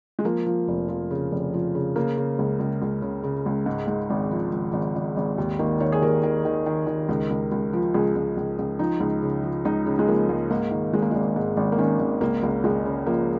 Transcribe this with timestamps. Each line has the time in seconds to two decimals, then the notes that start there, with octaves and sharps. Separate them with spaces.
0.19 G#3
0.24 F3 A#3
0.46 F3
0.68 F1
0.88 F3
1.11 C#3
1.32 F1
1.54 F3
1.75 C#3
1.96 C#3 A#3
2.17 C#3
2.39 C#2
2.59 C#2
2.82 C#2
3.02 C#3
3.23 C#3
3.46 C#2
3.66 G#2
3.88 G#2
4.10 G#1
4.31 F3
4.52 G#1
4.73 G#1
4.96 G#1
5.17 G#1
5.38 D#2
5.59 D#3 A#3
5.80 D#3 C#5
5.92 G#4
6.02 D#2 A#4
6.23 D#3 A#4
6.45 D#3
6.66 D#3
6.87 D#3
7.09 C#2
7.30 C#2
7.52 C#2
7.73 F3
7.94 C#2 G#4
8.16 C#2
8.37 C#2
8.59 C#2
8.79 F3 D#4
9.00 C#2
9.22 C#3
9.43 F3
9.65 C#2 D#4
9.86 C#3
9.99 G#3
10.08 F3 A#3
10.29 C#2
10.51 G#2 A#3
10.71 D#3
10.93 G#1 G#3
11.02 A#3
11.11 G#1 G#3
11.36 G#2
11.57 G#1
11.72 A#3
11.78 D#3 C#4
12.00 G#1
12.21 C#2 A#3
12.43 C#2
12.64 C#2 G#3
12.86 C#3
13.06 F3 A#3